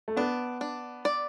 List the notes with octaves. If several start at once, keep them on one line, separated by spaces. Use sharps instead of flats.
A3
B3 D4
D4
D5